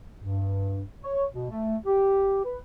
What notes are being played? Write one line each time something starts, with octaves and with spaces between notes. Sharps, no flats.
G2
C#5
B2
A3
G4
B4